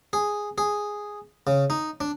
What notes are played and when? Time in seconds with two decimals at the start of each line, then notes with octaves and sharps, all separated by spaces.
0.13 G#4
0.58 G#4
1.47 C#3
1.70 D#4
2.01 D4